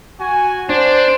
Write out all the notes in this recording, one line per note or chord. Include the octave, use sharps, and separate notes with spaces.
F#4 G#5
D4 C5